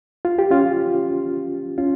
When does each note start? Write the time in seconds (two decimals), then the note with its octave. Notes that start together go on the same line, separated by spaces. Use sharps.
0.25 F4
0.39 G4
0.51 C#4 F4
1.78 C#4 F4